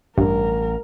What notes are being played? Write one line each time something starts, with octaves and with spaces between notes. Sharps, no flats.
A1 G2 A#4